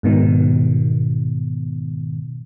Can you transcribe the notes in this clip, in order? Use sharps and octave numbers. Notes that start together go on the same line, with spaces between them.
G#2 B2 D#3